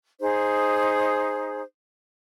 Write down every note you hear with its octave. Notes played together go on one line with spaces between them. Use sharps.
D#4 G#4 C5